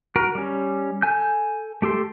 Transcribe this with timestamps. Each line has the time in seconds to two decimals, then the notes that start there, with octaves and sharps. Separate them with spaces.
0.16 F#4 A#4 B4
0.35 G3 C#4
1.02 A4 G#5 G6
1.82 A3 G4 A4 C6